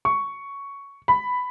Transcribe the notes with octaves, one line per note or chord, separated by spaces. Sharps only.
C#6
B5